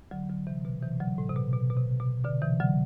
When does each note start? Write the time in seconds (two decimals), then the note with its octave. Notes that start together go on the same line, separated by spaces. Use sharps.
0.11 D3 F#3
0.29 D3 F#3
0.47 C3 E3
0.65 B2 D3
0.82 C3 E3
1.00 D3 F#3
1.18 A2
1.30 C3
1.36 B2
1.53 B2
1.70 B2
1.77 C3
2.00 B2
2.24 B2 D3
2.42 C3 E3
2.60 D3 F#3